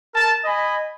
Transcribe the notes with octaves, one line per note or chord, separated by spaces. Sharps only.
A#4 A5
D#5 G#5 B5